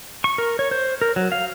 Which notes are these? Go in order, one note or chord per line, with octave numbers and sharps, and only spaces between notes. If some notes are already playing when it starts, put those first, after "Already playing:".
C#6
A#4
C#5
C5
A#4
F#3
F5